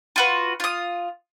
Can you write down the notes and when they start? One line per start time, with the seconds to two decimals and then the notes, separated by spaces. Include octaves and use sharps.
0.16 F4 F#4 B4
0.60 F4 D#6